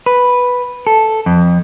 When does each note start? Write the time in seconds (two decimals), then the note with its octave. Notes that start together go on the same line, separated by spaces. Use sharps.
0.06 B4
0.87 A4
1.26 F2